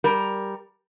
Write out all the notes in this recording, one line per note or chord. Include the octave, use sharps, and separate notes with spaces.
G3 A#4